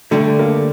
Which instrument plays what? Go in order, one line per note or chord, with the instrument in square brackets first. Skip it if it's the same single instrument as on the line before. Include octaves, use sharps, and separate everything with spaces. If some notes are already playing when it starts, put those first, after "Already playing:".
[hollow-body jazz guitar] D3 G3 D4 [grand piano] A3
[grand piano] A#3